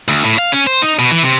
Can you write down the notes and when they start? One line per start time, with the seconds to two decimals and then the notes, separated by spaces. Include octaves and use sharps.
0.08 D2
0.25 A2
0.39 F5
0.52 C#4
0.67 C5
0.82 D#4
0.99 B2
1.11 E3
1.23 C3